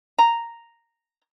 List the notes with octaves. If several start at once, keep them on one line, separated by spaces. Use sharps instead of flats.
A#5